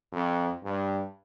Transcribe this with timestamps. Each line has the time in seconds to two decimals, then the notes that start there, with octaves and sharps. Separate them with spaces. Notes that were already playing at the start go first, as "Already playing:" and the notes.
0.13 F2
0.63 G2